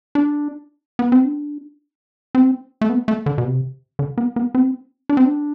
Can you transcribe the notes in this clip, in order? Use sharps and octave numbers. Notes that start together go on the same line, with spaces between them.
D4
B3
C4
D4
C4
A3
B3
A3
D3
B2
C3
D3
B3
B3
C4
D4
C4
D4